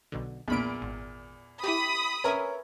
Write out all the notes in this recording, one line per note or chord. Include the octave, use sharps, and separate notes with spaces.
B1 B2 D3
B1 E2 A#2 B5 D7
G#1
E4 G4 B5 D#6
C#4 A#4 B4 E5 G#5